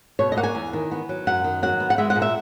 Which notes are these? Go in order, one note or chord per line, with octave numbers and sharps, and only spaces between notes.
B2 C#5
D#5
A#3 F#5
G#5
E2
D#3
B3
F#3
F#2 F#5
D#3
F#3 F#5
B3
F#5
G#3 E5
F#5
A#2
E5